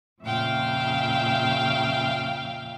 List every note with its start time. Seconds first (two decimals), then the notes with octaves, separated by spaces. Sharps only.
0.22 F2 A#2 C#3 E5 F5 G5